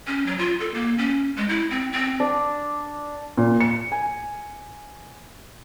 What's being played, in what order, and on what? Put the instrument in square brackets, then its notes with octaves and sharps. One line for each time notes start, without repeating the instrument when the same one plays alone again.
[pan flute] C#4
F#3
F4
A4
A#3
C#4
G#3
E4
C4
C4
[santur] D4
[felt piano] A#2
C#7
G#5